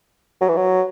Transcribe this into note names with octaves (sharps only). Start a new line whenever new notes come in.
F#3
E3
F#3